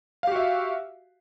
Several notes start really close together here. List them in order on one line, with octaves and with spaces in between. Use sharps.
F5 G4 F#4 E5